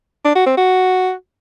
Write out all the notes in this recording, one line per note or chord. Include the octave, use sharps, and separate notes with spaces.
D4
F#4
C4
F#4